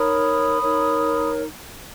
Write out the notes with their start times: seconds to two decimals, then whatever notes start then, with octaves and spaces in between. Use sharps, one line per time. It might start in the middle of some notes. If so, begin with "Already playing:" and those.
Already playing: D#4 A#4 C#5 B5 D#6
0.60 D#4 A#4 C#5